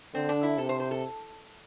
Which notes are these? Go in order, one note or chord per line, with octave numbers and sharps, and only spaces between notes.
D3 C4
D4
E4
C3 A4
C5
C5
A4